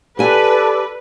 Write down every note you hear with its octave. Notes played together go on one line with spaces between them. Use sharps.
G4 A4 B4 D5 G#5